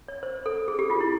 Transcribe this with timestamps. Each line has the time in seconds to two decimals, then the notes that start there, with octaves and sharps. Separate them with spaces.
0.08 C#5
0.23 C5
0.46 A4
0.68 G#4
0.79 G4
0.90 F4
1.00 E4